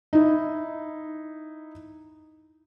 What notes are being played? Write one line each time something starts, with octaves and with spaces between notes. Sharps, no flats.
D#4 E4